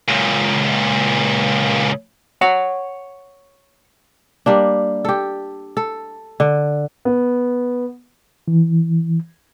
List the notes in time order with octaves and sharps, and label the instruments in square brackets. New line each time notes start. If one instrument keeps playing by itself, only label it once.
[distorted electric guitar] C#2 A#2
[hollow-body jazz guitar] C#5 F#5
[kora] G3 A#3 D4
G4 A4
A4
D3
[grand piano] B3
[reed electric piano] E3